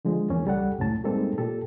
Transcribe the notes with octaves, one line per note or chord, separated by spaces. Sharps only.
D3 F3 G#3
E2 A#3 C#4
C#2 G3 A4 F#5
C#2 F#2 A2 A3 C#4 A5
G3 G#3 A#3 C4 D#4 A4
A#2 G4 A4